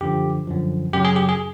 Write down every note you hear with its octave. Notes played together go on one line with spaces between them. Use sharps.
F#2 D3 F3 G4
F#2 D3 F3
F#2 C#3 F#3 G4
G#4
G4
G#4